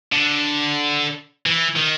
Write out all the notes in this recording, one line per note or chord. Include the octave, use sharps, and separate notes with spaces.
D3
E3
D#3